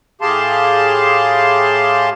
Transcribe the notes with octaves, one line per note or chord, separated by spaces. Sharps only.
A2 G4 G#4 F5 A5 C6